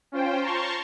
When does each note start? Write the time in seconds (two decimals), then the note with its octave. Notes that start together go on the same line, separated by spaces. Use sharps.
0.12 C#4 F4 C5 G5
0.43 A5 A#5 C6 C#6